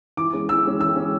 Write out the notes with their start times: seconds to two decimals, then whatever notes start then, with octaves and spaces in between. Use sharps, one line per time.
0.17 E3 D6
0.33 G#3 C#4
0.49 E3 E6
0.65 G#3 C#4
0.80 E3 E6
0.96 G#3 C#4